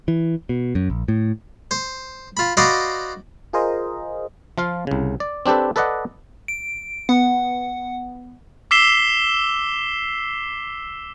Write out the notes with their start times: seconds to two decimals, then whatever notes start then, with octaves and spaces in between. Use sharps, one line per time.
0.08 E3
0.49 B2
0.75 F#2
0.90 A#1
1.08 A2
1.71 C5
2.37 F4 B5
2.57 F#4 C5 D5 D#5 F5 B5
3.53 F4 G#4 A#4 C5 D#5
4.58 F3 F4 F5
4.87 C2 C#3
5.20 D5
5.46 C4 D4 G4 A4 B4
5.76 A4 B4 D5 D#5 F#5
6.48 D7
7.09 B3 F#5
8.71 D6 E6 B6 C7 E7 G7